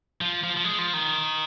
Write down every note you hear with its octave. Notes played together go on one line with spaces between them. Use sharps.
F3
F3
F3
G#3
F3
D#3